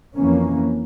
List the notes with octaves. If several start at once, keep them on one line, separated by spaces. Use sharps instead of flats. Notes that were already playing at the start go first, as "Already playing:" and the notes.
F2 E3 A#3 C#4